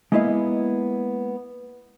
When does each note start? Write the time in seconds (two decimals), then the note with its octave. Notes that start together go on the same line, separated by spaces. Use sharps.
0.12 G#3 A#3 B3 E4 D#5 F5